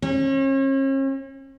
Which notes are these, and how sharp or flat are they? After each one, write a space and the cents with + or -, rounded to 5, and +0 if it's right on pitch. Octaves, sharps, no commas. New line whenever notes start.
C#4 -40